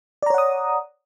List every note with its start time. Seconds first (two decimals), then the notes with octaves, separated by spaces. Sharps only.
0.23 D5
0.26 A#5
0.30 C#5
0.34 F#5
0.38 D#6